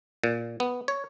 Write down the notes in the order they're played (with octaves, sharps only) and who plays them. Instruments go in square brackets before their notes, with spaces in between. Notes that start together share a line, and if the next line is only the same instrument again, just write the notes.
[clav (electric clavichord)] A#2
B3
C#5